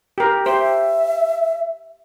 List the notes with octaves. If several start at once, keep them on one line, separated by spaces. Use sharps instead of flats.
G4 A#4
G4 C5 E5